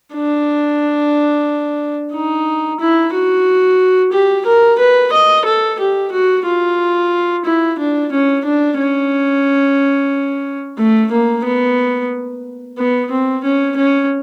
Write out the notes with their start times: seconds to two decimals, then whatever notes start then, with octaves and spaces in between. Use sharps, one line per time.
0.15 D4
2.13 D#4
2.80 E4
3.13 F#4
4.12 G4
4.46 A#4
4.79 B4
5.12 D#5
5.45 A4
5.80 G4
6.12 F#4
6.46 F4
7.45 E4
7.79 D4
8.12 C#4
8.45 D4
8.78 C#4
10.78 A3
11.11 A#3
11.45 B3
12.78 B3
13.11 C4
13.44 C#4
13.76 C#4